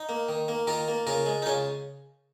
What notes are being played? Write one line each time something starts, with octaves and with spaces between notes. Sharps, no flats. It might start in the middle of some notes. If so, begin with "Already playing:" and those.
Already playing: D#4
A#3
D#3
A#3
D#3 F4 A#4
A#3
C#3 F4 A#4
G#3
D#4
C#3 C#4 F4